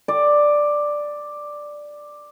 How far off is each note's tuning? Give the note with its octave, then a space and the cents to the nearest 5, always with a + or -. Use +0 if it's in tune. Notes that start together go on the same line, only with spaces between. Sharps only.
D5 +5